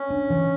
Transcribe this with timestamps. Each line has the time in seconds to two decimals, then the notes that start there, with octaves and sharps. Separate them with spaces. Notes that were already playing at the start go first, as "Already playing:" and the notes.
Already playing: C#4
0.10 D4
0.30 E3